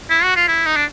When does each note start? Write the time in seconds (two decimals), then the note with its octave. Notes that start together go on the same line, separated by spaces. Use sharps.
0.10 E4
0.24 F#4
0.36 F4
0.48 E4
0.66 D#4
0.76 D4